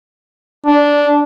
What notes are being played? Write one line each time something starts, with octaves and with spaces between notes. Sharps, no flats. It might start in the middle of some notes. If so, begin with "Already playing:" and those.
D4